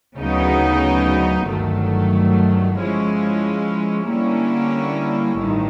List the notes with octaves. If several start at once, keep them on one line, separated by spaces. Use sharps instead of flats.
D2 C#3 F#3 B3 D#4
G1 G2 D#3 F#3 A3
F3 G#3 C#4 E4
D3 G3 A#3 C#4 E4
A1 G2 D#3